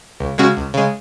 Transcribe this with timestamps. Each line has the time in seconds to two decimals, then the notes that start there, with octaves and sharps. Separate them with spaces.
0.20 C#2
0.38 C#3 G#3 C#4 F#4
0.57 C#2
0.74 C#3 G#3